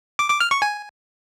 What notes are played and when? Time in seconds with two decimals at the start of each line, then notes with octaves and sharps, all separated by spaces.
0.19 D6
0.30 D6
0.40 F6
0.51 C#6
0.62 G#5